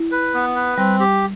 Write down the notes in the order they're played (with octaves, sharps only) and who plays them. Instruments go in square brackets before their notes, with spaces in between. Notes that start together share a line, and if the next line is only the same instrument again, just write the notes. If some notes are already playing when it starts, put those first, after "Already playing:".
Already playing: [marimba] E4
[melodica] B4
B3
B4
[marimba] G3 [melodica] C4
[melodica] G4